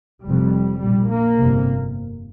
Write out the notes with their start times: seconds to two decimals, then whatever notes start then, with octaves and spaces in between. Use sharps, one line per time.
0.26 F1 F2 C3 G3
0.82 A#1 A#2 G3
1.11 A#3
1.39 G1 F2 C3